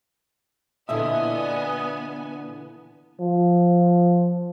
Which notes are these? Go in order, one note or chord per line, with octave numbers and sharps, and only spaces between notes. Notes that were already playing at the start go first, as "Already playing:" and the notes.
A#2 D3 E3 B3 D#5 E5 G#5
F3